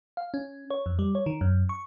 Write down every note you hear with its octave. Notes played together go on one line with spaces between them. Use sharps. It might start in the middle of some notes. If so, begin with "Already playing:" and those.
F5
C#4
C#5
F2
G3
C#5
D#3
F#2
C#6